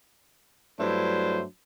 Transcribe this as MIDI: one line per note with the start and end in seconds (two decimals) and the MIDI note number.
0.79 1.42 43
0.79 1.42 54
0.79 1.42 57
0.79 1.42 62
0.79 1.42 64
0.79 1.42 72